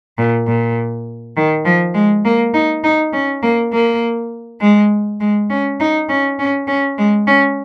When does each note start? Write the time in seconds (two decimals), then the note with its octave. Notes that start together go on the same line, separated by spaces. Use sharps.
0.18 A#2
0.47 A#2
1.36 D#3
1.65 F3
1.95 G#3
2.24 A#3
2.54 D#4
2.84 D#4
3.13 C#4
3.43 A#3
3.72 A#3
4.61 G#3
5.20 G#3
5.50 C#4
5.80 D#4
6.09 C#4
6.39 C#4
6.67 C#4
6.98 G#3
7.27 C#4